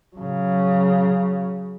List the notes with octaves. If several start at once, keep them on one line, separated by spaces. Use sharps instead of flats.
C#3 F#3